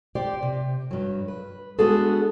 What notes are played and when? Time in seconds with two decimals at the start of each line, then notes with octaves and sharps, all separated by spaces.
0.15 G4 C5 D5
0.43 C3
0.91 G2 F#3
1.28 B4
1.79 G#3 B3 D4 F#4 G#4 A4